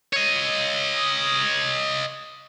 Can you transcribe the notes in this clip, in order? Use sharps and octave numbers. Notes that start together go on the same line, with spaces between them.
C#5 D#5